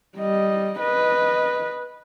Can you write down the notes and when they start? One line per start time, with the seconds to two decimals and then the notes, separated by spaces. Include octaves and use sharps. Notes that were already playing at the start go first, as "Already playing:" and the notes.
0.18 G3 D#5
0.80 B4 D#5